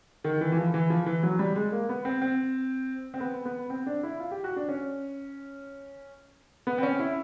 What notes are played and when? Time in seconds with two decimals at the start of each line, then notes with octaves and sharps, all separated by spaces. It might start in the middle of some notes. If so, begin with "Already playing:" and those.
0.24 D#3
0.41 E3
0.52 E3
0.57 F3
0.74 E3
0.90 F3
1.06 E3
1.23 F#3
1.39 G3
1.56 G#3
1.72 A#3
1.89 B3
2.05 C4
2.22 C4
3.14 C4
3.20 B3
3.45 B3
3.70 C4
3.86 D4
4.03 E4
4.20 F4
4.31 G4
4.44 F#4
4.56 D4
4.69 C#4
6.67 B3
6.78 C4
6.83 C#4
6.99 E4